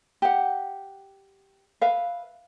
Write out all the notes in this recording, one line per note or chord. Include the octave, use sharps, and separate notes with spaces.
G4 F#5
B4 E5 F5